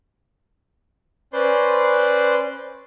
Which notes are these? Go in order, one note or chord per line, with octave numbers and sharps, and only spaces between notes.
C#4 B4 C5 D5 C6